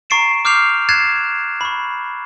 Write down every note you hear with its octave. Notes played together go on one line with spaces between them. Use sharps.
A#5 C#6 A6 C7 D7 E7
D6 F6 G6 C7 F7
F#6 G#6 A6 C7 E7
B5 C#6